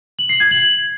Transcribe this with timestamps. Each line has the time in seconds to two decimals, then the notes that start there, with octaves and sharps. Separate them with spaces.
0.19 F#7
0.29 C7
0.40 G#6
0.51 F#7